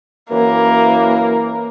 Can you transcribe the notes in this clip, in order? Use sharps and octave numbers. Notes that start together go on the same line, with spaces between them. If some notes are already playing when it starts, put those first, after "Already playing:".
F#2 E3 A#3